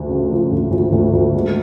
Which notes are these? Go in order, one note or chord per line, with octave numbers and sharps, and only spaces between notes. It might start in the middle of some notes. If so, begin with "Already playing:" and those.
Already playing: D2
C#3
F3
D2
D2
D2
D2
G#3